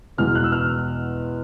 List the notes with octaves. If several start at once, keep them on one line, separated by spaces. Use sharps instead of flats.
E2 B2 G#3 B3 F6
F#6
E6
F6